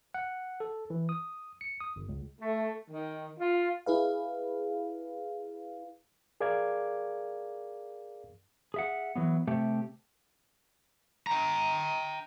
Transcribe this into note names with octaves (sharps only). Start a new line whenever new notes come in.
F#5
A4
E3
D#6
C#7
D#6
G1
C#2
A3
D#3
F4
E4 G#4 B4 F5
G#4 A#4 D5 F5 D6 G#6
G#4 E5 F#5
E3 F#3 B3
C3 A3 G4
G5 A#5